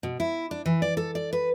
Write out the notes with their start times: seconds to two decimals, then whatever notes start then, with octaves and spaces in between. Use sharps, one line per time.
0.03 B2
0.20 E4
0.51 D4
0.66 E3
0.82 D5
0.97 A4
1.15 D5
1.33 B4